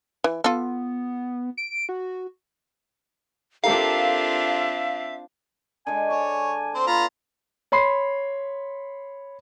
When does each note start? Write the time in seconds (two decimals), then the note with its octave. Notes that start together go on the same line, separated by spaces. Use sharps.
0.24 E3
0.44 B3 F4 A4
1.57 D7
1.89 F#4
3.64 C4 D4 F4 G4 A4 A#4 E5 F5
5.87 D3 G#3 G#5
6.10 C#5 D5 A5
6.74 C4 C5
6.87 B3 F4 A#5 B5
7.72 C#5 B5 C6 C7